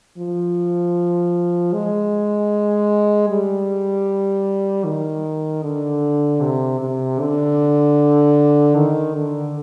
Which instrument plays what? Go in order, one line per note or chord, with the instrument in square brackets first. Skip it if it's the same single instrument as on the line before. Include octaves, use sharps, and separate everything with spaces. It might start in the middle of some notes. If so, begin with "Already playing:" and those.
[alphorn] F3
G#3
G3
D#3
D3
C3
C3
D3
D#3
D3